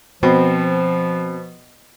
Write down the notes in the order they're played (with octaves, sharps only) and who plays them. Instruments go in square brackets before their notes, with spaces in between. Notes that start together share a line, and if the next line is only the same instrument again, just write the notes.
[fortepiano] B2 [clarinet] F3 [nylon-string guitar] C4